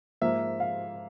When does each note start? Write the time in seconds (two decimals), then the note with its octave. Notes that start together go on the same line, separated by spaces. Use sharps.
0.21 G#2 F3 A#3 E5
0.60 F5